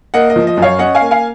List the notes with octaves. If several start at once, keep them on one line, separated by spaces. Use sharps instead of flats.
A#3 D#5 F#5
D#5
F3
D#5
F#2
C#5 F5
C#4 D#5 F#5
F5 G#5
A#3
F5 G#5